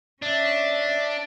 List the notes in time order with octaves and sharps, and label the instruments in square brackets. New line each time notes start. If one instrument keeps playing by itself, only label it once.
[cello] C#4 E5 [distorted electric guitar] D4